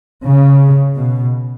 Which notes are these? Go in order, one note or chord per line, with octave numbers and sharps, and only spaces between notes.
C#3
B2